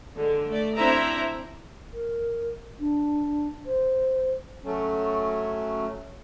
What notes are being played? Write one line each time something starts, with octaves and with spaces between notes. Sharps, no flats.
D3 G#3
A3 D5
C4 D4 E4 C5 E5 A#5
A#4
D4
C5
F#3 A3 C#4